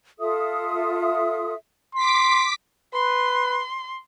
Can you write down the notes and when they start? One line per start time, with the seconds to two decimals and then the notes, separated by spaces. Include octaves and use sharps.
0.19 F4 A4 E5 D#6
1.95 C6 D6 B6
2.94 B4 C6